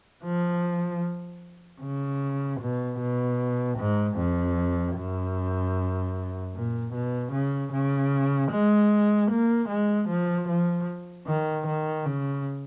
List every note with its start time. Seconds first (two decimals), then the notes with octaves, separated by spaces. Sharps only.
0.24 F3
1.81 C#3
2.60 B2
2.99 B2
3.78 G#2
4.17 F2
4.96 F#2
6.54 A#2
6.94 B2
7.32 C#3
7.72 C#3
8.52 G#3
9.30 A#3
9.69 G#3
10.09 F3
10.48 F3
11.27 D#3
11.67 D#3
12.05 C#3